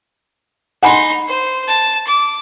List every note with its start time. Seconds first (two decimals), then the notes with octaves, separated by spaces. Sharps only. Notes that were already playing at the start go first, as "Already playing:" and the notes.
0.83 D#4 F#5 G#5 B5 C6
1.28 C5
1.68 A5
2.07 D6